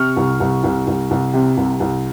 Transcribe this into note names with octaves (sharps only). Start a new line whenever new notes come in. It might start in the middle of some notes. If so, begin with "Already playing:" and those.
Already playing: C3 C#6 F6
C2
C2
C2
C2
C2
C3
C2
C2